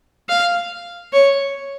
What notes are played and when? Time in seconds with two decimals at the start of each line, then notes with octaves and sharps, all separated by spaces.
0.29 F5
1.13 C#5